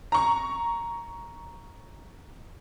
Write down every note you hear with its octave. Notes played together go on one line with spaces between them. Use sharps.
A#5 C#6